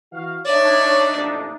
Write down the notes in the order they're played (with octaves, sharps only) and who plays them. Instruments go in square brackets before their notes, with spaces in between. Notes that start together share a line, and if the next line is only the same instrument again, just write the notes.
[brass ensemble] E3 F#4 F5
[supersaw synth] D4 D#4 [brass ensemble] C#5 [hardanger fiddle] D5 E5
[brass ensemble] A1 F2 A#2